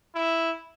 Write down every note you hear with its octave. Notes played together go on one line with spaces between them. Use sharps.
E4